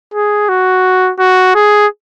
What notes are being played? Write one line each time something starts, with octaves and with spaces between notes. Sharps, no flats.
G#4
F#4
F#4
G#4